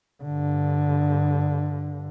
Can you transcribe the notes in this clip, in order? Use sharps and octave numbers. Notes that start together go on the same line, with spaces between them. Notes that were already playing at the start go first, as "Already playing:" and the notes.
G2 D3